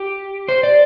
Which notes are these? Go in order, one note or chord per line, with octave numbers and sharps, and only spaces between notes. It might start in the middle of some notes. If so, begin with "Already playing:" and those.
Already playing: G4
C5
D5